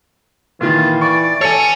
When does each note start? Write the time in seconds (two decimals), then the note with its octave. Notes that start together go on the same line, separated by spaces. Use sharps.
0.61 A#2 D#3 E3 F4
1.01 D5 C#6
1.41 A4 C#5 G#5 C#7